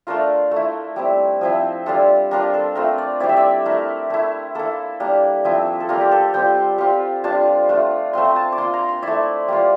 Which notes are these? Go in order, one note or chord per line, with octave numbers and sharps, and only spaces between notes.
A3 D4 F4 A#4
A3 E4
G3 C4 E4
F3 C4 E4
G3 D4 F4 A4
G3 D4 F4 A#4
A4
A3 C4 F4 A#4
D5
G3 C4 E4 D5
E5
D5
A3 E4 A#4
A3 E4
A#3 E4 A4
G3 A#3 D4
F3 C4 E4
A4
G3 A#3 F4 A#4
G4
A4
G3 C4 F4 G5
G3 C4 F4
G3 D4 F4 A5
A3 D4 F4
A3 C4 F4 C6
A#5
A5
D6
A#3 F4 C6
A#5
C6
A3 E4 D5
G3 A#3 F4